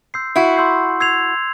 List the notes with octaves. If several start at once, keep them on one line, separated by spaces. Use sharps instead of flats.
C6 E6 G6 C7
E4 F#4
C6 E6 G6 C7
E6 G#6 C7 F7